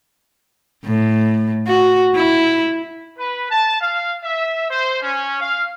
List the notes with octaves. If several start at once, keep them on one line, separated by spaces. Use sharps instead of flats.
A2
F#4
E4
B4
A5
F5
E5
C5
C#4
F5